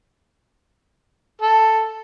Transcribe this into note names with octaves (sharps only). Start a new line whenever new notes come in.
A4